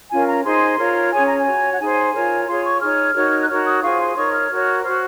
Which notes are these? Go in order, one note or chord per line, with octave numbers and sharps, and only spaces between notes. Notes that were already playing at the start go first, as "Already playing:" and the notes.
C#4 F4 A#4 G#5
A#5
D#4 G#4 C5 C6
F4 A#4 C#5
C#4 G#4 C#5 G#5
A#5
G#5
F#4 C#5
F#5
D#4 G#4 C5 G#5
F4 A#4 C#5
F4 G#4 C#5 C6
C#6
D#4 G#4 C#5 F6
D#4 F#4 A#4 C#5
F#6
D#4 F#4 A#4 C#5 F6
D#6
F4 G#4 C5 C#6
C6
D#4 A#4 C#5 C#6
F6
F#4 A#4 C#5
F#4 C5 F6